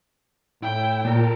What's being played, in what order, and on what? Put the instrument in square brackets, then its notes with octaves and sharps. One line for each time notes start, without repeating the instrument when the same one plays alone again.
[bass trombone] A2 [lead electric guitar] E4 [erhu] G5
[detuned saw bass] A#2 [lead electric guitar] A4 A#4